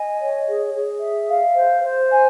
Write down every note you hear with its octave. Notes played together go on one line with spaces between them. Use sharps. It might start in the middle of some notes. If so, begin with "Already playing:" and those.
Already playing: D#5 G#5
C#5
G#4
G#4
E5
F5
C5
C5
G#5